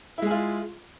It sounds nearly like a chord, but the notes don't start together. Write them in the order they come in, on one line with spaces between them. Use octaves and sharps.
E4 G#3 G#4 F4